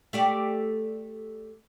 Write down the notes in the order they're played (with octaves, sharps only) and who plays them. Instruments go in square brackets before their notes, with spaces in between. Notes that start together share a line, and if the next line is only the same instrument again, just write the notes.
[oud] A3 G4 D5